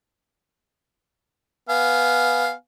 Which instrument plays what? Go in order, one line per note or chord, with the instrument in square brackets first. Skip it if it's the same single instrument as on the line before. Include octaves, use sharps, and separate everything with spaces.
[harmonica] B3 F5 G#5